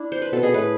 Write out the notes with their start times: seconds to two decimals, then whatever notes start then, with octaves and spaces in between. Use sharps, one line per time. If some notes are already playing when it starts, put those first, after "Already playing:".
Already playing: D4 E4
0.12 C5
0.22 B4
0.32 B2 A4
0.43 B2 G#4
0.54 A2 B4